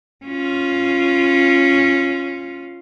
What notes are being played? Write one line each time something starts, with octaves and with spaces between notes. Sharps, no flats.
C#4 F4